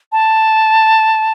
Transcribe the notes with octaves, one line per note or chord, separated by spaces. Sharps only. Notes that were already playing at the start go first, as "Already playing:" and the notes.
A5